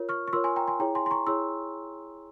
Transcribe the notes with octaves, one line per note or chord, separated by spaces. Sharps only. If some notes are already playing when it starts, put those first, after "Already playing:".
Already playing: F4 A#4 C#5
C#6 F6
C#6
F4 A#4 C#5 C6 E6
G#5 C6
G5 A#5
G#5 C6
E4 G#4 C#5 G5 A#5
G#5 C6
C6
A#5 C#6
E4 G#4 C#5 C6 E6